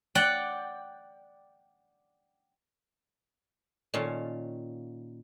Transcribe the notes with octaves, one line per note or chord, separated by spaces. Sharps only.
D5 F#5 G5
A#2 D#3 C#4 F4 C#5 A5